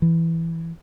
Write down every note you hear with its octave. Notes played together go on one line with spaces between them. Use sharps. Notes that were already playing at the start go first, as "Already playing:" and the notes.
E3